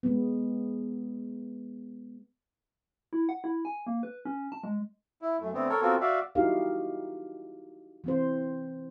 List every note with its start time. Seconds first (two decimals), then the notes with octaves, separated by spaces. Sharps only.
0.03 G#3 B3
3.13 E4
3.29 F#5
3.44 E4
3.65 G#5
3.87 A#3
4.03 B4
4.25 C#4
4.52 A5
4.63 G#3
5.22 E4
5.40 F#2 A3
5.54 D3 A3 B3 C4
5.70 A4 A#4 C#5
5.82 B3 C4 F4 F#4 A4 A#4
6.01 F#4 D5 E5 F5
6.35 D#4 E4 F#4 G4 A#4 F5
8.04 E3 C4 C5